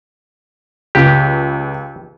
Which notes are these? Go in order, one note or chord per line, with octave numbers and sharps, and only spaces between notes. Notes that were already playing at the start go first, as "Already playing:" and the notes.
C#2 G4